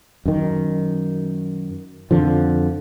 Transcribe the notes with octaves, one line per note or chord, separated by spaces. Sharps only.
F#2 D#3
F2 D3 F3